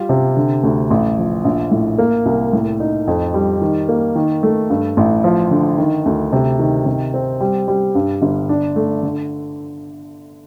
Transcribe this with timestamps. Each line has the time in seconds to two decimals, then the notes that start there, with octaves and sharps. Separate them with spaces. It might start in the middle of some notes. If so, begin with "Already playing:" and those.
Already playing: G3 F4
0.09 C3
0.36 D3
0.63 D2
0.90 A1
1.18 F3
1.45 A#1
1.71 A2
1.98 A#3
2.26 C2
2.53 A2
2.80 D#4
3.07 F2
3.34 G3
3.61 D#3
3.89 A#3
4.16 D#3
4.43 A3
4.70 G2
4.97 A1
5.24 F3
5.51 D3
5.78 D#3
6.06 D2
6.33 C3
6.59 D#3
6.86 C3
7.14 C4
7.40 G3
7.68 G3
7.95 G2
8.22 G1
8.49 D4
8.76 A3
9.03 D3